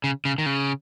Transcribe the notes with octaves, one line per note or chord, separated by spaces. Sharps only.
C#3
C#3
D#3
C#3